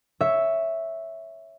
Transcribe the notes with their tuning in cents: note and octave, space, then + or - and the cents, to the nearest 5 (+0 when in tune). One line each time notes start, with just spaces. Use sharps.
C#5 +0 E5 +0